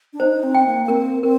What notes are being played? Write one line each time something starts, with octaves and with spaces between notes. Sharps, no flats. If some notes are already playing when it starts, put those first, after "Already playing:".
D4
D#4 C5
C4
G5
A#3
A#3
C4 A#4
C4 A#4